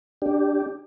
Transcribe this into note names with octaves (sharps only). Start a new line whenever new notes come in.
D4 G4